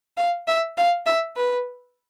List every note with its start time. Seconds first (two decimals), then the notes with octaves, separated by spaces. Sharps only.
0.17 F5
0.47 E5
0.77 F5
1.06 E5
1.36 B4